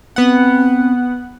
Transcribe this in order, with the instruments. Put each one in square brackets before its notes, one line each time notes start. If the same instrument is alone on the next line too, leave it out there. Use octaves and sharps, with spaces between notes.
[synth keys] B3 F#5 [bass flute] C4